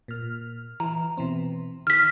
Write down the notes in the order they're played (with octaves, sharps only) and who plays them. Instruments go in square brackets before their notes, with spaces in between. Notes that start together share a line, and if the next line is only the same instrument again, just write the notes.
[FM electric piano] A#2 F6
[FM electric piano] E3 [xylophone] A#5
[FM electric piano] B2 E3 C4
[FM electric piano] D#3 [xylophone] F6 B6